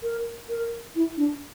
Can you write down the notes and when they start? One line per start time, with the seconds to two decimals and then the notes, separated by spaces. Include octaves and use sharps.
0.03 A#4
0.49 A#4
0.95 E4
1.17 D4